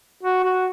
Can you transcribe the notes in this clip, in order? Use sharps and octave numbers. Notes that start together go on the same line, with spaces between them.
F#4
F#4